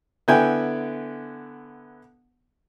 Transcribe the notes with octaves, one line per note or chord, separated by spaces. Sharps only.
D3 B3 E4 G5 G#5